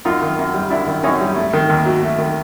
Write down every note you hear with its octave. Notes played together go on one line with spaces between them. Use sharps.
F#2 D#4 F4
D#3
F#2
G3
F#2 D4 E4
D#3
F#2 C#4 D#4
G3
A3
D#3
D#2
F#3
A3
D#3